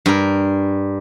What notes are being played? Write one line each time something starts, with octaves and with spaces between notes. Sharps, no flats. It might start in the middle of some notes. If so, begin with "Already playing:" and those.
G2 A#4